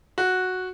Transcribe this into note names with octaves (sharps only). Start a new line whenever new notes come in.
F#4